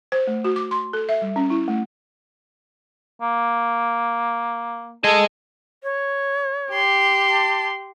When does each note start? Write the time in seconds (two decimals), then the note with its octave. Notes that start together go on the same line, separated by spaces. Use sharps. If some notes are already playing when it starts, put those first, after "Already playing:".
0.12 C5
0.27 A3
0.44 F#4
0.56 D6
0.71 C6
0.93 A4
1.09 E5
1.22 G3
1.36 C#4
1.50 E4
1.68 A3
3.21 A#3
5.04 G#4 A4 D#5
5.83 C#5
6.72 G4 C6
7.30 A5